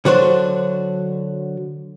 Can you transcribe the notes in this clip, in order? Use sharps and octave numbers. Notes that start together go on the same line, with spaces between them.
D3 F#3 D4 C5